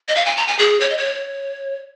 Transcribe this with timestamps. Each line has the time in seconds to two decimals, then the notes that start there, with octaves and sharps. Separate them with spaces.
0.08 D#5
0.15 F5
0.26 G#5
0.37 A#5
0.47 G#5
0.59 G#4
0.81 C#5
0.90 D#5
0.98 C#5